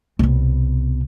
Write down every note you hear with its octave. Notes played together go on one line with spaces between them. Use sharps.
C2 B2